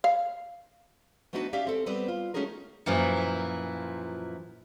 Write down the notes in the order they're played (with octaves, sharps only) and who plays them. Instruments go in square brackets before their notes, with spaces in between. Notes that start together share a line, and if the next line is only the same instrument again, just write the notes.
[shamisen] F5
[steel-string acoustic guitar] A3 B3 D4 D#4 F#4 B4
C#4 G4 D5 E5 F5
C4 A4
G3 B3 C4 B4 C5 D5
F4
A3 C#4 D#4 F#4 G#4 A#4
[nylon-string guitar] F#2 A#2 E3 F3